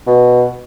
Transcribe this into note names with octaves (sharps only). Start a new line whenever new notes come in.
B2